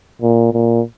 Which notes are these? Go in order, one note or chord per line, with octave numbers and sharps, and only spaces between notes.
A#2
A#2